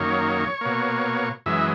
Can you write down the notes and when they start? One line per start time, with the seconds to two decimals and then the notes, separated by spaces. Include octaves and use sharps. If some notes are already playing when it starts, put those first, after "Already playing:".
Already playing: F#2 D#3 A#3 C#5
0.61 B2 A#3
1.46 F#2 E3 G#3 E5